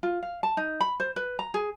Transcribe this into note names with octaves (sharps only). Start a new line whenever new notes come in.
F4
F5
A5
D#4
B5
C5
B4
A#5
G#4